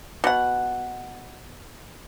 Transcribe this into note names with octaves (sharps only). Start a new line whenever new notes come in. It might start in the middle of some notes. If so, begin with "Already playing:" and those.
B2 F#5